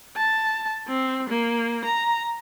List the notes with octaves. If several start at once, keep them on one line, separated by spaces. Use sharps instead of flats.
A5
C4
A#3
A#5